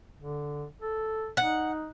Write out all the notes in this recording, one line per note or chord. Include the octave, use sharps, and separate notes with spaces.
D3
A4
D#4 F#5